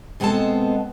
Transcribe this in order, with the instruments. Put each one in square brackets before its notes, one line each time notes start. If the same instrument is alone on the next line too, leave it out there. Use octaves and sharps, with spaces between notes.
[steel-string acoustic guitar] B2 G#3 B3 C4 A4 A5